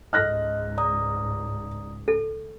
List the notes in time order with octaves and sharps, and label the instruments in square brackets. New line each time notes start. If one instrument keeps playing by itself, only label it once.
[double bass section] C#2 G#2 [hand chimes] D#5 [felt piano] F6 F#6 A#6
[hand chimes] D5 A#5 D#6
[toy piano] A4